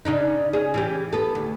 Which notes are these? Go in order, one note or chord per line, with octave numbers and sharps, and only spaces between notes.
C#3 D4 D#4
C#4 G#4
E3 C#4 G4
B3 A4
D2